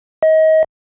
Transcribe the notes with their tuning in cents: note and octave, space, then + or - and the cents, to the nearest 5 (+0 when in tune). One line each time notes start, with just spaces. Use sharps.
D#5 +30